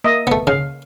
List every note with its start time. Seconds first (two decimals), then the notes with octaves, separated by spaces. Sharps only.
0.04 A#3 D#5 E5
0.27 A3 B3
0.47 C#3 F5